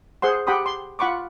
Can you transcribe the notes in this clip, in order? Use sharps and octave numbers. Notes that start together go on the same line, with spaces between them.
G#4 C5 F#5 C6
G4 F#5 G5 B5 C6 D#6
C6
F4 F#5 B5 C#6 D6